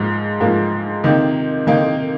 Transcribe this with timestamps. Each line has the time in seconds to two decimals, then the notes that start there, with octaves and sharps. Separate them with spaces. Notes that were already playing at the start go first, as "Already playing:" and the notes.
Already playing: G#2 F3 A#3
0.40 G#2 F3 A#3
1.04 C3 D#3 A#3 D#4
1.67 C3 D#3 A#3 D#4